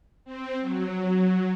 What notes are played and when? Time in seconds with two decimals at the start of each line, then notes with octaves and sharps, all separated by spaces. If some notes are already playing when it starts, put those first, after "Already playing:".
0.25 C4
0.61 F#3